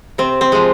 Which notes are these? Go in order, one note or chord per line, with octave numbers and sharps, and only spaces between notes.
C3 C4
C4
F3 G#3